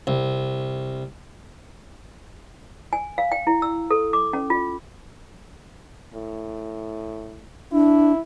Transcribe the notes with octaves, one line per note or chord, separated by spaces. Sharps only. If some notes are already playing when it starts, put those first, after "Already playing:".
C2
G#5
F5
G5
E4
E6
A4
D6
C#4
F4
A2
D4 E4